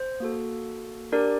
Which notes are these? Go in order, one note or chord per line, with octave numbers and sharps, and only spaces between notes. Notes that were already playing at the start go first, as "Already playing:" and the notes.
Already playing: C5
A#3 F#4 A4
D4 G4 A#4 D5